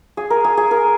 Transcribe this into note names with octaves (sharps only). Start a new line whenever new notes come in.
G#4
A#4
G#4
G#4
A#4